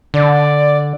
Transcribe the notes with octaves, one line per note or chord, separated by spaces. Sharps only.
D3 D5